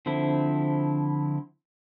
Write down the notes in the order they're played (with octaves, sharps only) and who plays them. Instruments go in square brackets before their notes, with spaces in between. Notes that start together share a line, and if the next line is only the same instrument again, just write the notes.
[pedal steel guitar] D3 F3 C4 E4